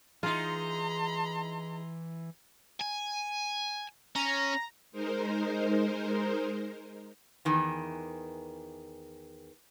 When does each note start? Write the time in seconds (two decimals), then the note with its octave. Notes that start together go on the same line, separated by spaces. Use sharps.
0.23 E3 D#4 F4 G#4 A#5 C6
2.80 G#5
4.16 C#4 A#5
4.92 G#3 D#4 A#4 C5
7.45 E2 D#3 E3